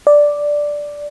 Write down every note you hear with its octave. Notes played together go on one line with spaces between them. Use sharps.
D5